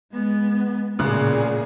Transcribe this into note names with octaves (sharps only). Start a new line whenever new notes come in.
G#3 B3
A1 A#2 C#3 G#4 F#6